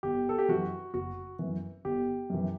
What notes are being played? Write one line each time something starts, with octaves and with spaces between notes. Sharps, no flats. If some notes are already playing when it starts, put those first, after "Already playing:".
G1 G4
A4
G4
F#2 E3 F#4
F#1 F#4
F#2 E3
G1 G4
F#2 E3